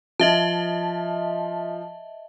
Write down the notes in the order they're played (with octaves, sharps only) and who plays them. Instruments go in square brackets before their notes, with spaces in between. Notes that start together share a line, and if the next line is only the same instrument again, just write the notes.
[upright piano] F3 [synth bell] D#5 E5 A5